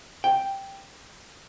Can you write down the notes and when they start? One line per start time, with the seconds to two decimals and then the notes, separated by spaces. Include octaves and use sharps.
0.24 G5